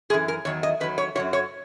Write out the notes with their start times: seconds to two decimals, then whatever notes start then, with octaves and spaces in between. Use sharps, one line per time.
0.10 F#2 G#4
0.14 E3
0.28 A#4
0.45 E2 D#3 F#3 C#5
0.63 D#5
0.80 E2 D#3 F#3 B4
0.98 C#5
1.15 F#2 D#3 F#3 C#5
1.33 C#5